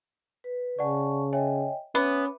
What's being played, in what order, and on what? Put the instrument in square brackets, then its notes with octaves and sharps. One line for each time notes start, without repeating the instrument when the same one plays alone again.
[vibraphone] B4
[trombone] C#3 [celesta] D5 F#5 [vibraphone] G#5 A5 C#6
[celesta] C#5 E5 G#5 [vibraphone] D#5 G5
[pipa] B3 [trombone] C#4 [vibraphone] E5 [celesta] D6